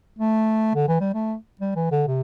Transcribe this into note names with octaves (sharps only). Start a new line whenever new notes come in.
A3
D3
E3
G3
A3
G3
E3
D3
C3